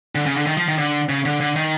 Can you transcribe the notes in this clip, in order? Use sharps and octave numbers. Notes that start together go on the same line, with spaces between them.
D3
C#3
D3
D#3
F3
D#3
D3
C#3
D3
D3
D#3